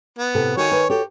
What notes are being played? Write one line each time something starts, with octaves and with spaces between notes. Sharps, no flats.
B3
A2 C3 A4
D#3 F#4 C#5 G#5
B4
F#4 G4 A4 C#5